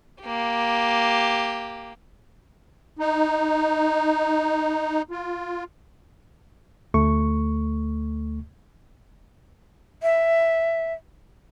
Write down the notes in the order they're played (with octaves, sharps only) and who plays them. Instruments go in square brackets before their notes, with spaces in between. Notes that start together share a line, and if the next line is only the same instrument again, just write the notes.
[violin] A#3 G4
[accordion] D#4
F4
[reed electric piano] D2 A3 C#6
[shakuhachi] E5